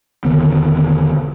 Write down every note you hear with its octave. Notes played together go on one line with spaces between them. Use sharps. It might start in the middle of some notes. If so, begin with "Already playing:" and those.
E1 D3 D#3 B3